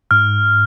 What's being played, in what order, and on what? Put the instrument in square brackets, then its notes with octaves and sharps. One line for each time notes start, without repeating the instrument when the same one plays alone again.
[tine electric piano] G#2 [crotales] F6